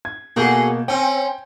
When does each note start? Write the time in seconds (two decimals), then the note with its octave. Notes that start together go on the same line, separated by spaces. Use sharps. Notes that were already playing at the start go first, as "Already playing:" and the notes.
0.05 G#6
0.36 B2 A#3 F#4 G#4 A4 G6
0.88 C4 C#4 G5